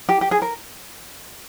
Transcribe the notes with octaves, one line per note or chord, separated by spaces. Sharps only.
G4
G4
G#4
A#4